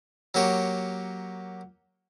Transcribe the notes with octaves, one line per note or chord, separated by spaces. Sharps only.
F#3 A#3 G4 C#5